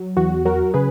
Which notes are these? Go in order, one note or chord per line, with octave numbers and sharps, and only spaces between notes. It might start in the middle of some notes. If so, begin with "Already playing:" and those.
Already playing: F#3
E2 F#4
F#3 F#4 A#4
C#3 G#4 B4